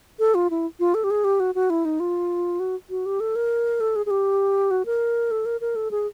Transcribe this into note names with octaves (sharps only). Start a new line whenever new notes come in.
A4
F4
E4
F4
A4
G4
G#4
G4
F#4
F#4
E4
D#4
F4
F#4
F#4
G4
A4
A#4
A4
G#4
G#4
G4
F#4
A#4
A4
A#4
A#4
A4
G#4